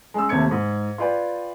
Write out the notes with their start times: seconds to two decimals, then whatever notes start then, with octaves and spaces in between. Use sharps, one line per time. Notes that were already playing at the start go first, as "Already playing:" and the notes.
0.14 G#3 C#4 E6
0.29 D#2 C3 A3 G#6 C#7
0.51 G#2
0.98 F4 B4 D5 G5